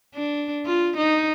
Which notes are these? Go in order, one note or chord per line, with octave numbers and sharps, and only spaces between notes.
D4
F4
D#4